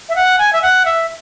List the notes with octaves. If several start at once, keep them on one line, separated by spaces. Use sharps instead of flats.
E5
F#5
G#5
E5
F#5
E5